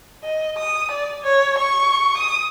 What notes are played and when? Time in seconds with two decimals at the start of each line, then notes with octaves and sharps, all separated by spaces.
0.23 D#5
0.57 D#6
0.92 D5
1.23 C#5
1.59 C#6
2.18 D#6